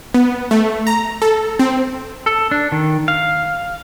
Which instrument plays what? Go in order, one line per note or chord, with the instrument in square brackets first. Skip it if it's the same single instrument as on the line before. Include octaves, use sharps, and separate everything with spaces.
[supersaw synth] B3
A3
A#5
A4
C4
[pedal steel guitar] A4
D4
D#3
F5